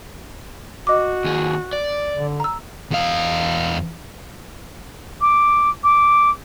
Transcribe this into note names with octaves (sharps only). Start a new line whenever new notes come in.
F#4 D#5 D6
D#2 G#4
D5
D3
A#5 E6
E2 F5
D6
D6